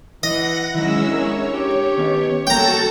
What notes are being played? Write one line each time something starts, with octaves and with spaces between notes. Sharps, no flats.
E3 D#5 F#5 A#6
D#3 F#3 G#3 C#4 E4 E6
D4 G#4 A#4 C#5
G4
D#3 B3 C#4
G3 A#3 C#4 F#4 A4 G5 A5 A#5